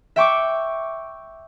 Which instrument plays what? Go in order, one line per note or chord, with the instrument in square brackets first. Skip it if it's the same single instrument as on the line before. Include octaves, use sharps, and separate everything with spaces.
[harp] E5 G5 C#6 D6